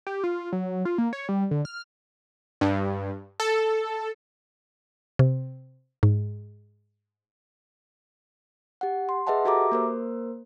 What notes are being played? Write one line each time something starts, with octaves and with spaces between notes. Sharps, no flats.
G4
F4
F#3
F4
A#3
C#5
G3
D3
F6
G2
A4
C3
G#2
G4 F#5
C6
G#4 B4 D#5 E5 F#5 A5
F#4 G4 A4 E5 A#5 D6
A#3 A#4 C5